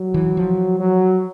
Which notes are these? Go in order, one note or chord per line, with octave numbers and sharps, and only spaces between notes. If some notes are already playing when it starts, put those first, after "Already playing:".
Already playing: F#3
E3
F3
F#3